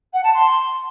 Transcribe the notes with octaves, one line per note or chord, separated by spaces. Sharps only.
F#5
A5
C6